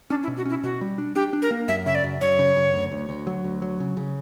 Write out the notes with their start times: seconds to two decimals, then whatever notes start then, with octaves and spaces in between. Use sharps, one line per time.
0.10 C#4 D4
0.23 E4
0.28 B2
0.37 F#4
0.46 C#4 E4
0.63 B2 F#4
0.81 G3
0.98 D4
1.15 D4 G4
1.33 D4
1.42 A#4
1.51 A#3
1.68 F#2 E5
1.86 C#3 E5
1.95 D5
2.04 F#2
2.21 F#2 C#5
2.39 C#3
2.56 F#2
2.74 D2
2.92 D2
3.09 D2
3.27 F#3
3.44 D2
3.62 F#3
3.80 C#3
3.97 C#3